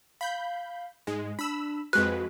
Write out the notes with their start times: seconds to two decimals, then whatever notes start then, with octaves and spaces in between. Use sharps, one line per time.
0.21 F5 B5 G6
1.07 G#2 G#3
1.39 D4 B5 E6
1.93 F2 G#3 F#4 B4 F#6